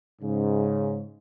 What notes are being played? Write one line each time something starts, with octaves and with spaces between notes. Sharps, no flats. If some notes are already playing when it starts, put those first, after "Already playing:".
G#2 C#3